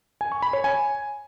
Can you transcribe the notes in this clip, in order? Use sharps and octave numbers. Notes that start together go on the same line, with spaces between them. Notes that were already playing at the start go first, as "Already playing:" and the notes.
G#5
C#6
B5
C#5
G#5